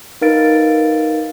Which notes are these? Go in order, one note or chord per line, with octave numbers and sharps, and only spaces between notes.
D#4 A#4 B4 F5 A6 D7